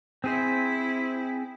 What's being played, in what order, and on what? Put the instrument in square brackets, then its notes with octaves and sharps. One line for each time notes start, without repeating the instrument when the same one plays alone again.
[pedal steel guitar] C4 G#4 C5 [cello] E4